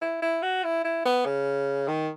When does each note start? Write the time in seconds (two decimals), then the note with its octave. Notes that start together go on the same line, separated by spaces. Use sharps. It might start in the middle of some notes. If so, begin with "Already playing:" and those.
0.02 E4
0.22 E4
0.42 F#4
0.64 E4
0.84 E4
1.05 B3
1.25 C#3
1.88 D#3